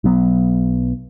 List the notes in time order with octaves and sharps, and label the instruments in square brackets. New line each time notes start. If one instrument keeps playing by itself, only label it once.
[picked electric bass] B1 F#3 B3